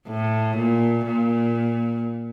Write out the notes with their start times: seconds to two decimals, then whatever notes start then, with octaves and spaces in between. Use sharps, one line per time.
0.09 A2
0.57 A#2
1.07 A#2